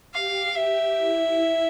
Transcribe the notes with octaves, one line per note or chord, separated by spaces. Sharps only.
G4 F5
G4 E5
E4